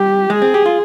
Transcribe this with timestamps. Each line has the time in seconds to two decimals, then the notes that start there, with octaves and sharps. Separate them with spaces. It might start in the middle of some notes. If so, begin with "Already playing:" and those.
Already playing: G3 G4
0.30 G#3 G#4
0.42 C4
0.54 G4
0.66 F4